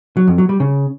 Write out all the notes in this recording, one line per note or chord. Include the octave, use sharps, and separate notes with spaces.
F#3
F2
F#3
G3
C#3